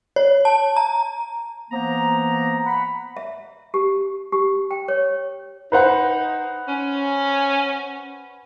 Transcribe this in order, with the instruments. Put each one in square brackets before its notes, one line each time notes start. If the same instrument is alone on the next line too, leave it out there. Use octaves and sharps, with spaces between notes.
[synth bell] C#5
A5
A#5
[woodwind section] E3 A#3 B3 C5 A#5
F#5 B5
[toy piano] E5
G4
G4
G5
C#5
[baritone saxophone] D#4 [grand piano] B4 C5 F#5
[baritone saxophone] C#4